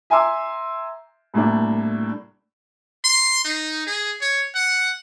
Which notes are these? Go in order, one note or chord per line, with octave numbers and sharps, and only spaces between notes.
E5 G#5 A#5 C6 D6 E6
C2 A2 A#3 D4
C6
D#4
G#4
C#5
F#5